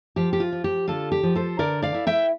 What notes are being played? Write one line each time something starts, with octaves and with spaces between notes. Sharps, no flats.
F3 G4
G4
F4
F3
G4
D3 F4 A4
G4
F3
A4 C5
D3 A#4 D5
D5 F5
E4
E5 G5